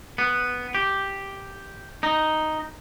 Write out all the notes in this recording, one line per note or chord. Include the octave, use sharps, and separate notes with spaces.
B3
G4
D#4